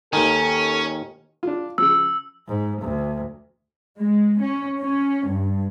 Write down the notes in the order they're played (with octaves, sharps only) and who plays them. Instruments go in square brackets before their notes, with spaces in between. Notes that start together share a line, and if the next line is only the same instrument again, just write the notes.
[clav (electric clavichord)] D#2 D#3 [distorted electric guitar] C#4 [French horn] A4 [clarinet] G#5
[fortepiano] D4 F4
[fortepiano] C#3 F3 [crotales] E6
[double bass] G#2
D2
[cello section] G#3
C#4
C#4
G2